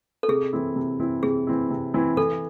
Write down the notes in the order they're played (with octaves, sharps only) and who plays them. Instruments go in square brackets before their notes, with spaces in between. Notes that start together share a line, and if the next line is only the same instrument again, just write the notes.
[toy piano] A4
[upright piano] C3 [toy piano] G#4
[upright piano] E3 C4 E4
C3
E3 C4 E4
[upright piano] C3 [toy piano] G#4
[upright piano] E3 C4 E4
C3
E3 C4 E4
[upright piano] E3 [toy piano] A4